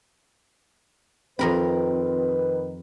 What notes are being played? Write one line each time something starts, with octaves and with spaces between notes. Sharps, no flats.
F2 D#3 C4 F4 A#4 B4 B5